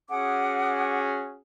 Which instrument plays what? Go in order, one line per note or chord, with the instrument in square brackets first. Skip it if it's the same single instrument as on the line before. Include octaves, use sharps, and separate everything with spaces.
[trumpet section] C#4 F#4 G#4 [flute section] F#5 D6 D#6